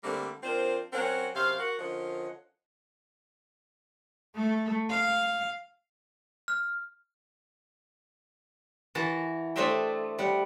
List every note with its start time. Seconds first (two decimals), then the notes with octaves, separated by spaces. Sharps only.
0.03 D3 G3 A3 A#3 C4
0.43 F3 C4 D4 F4 A#4 C5
0.93 F#3 C4 C#4 A#4 F#5
1.35 F#2 C3 C5 F5
1.58 F#4 A#4 F#5
1.79 D3 F3 C#4 A#4 D#5 F#5
4.36 A3
4.90 F5
6.48 F6
8.95 E3 F#4 A5
9.56 A3 D4 C5 D#5 E5 G5
10.19 G3 F#5